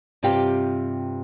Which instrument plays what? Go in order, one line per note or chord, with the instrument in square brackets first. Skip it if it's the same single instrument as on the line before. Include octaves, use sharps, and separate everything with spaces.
[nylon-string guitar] G2 C3 C4 F4 G4 G5